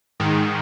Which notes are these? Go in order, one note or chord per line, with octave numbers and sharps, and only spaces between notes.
G#2 D#3